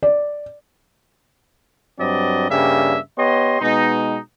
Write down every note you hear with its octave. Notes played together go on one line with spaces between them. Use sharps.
D5
G2 F#3 C4 D5 D#5
G2 C#3 G3 A#3 E5
B3 G4 C#5 D#5 C6
B2 G#3 B3 D#4